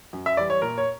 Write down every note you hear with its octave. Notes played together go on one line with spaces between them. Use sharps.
F#2
E5
E3 G3 D5
C#5
A#2 A#4
C#5